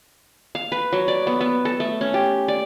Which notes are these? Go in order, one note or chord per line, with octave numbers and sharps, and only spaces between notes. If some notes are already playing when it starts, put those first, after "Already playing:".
F5
B4
F#3
D5
B3
B3
A4
A3
C#4
G4
D5